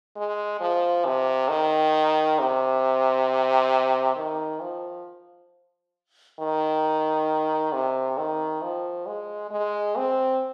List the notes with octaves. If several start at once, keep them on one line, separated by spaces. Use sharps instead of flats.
G#3
F3
C3
D#3
C3
D#3
F3
D#3
C3
D#3
F3
G#3
G#3
C4